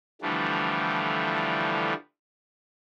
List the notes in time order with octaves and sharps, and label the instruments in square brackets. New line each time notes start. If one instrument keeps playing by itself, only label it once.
[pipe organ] D3 E3 F3 G3 A3